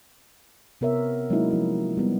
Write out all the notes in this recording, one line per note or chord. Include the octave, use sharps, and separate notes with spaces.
C3 B3 A#4 C#5 E5
F#3 G#3 A#3 C#4 D#4 E4
F3 E4
G3 B3